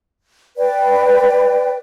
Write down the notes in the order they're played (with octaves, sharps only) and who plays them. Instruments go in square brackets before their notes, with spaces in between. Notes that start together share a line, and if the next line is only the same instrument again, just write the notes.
[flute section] B4 D5 G5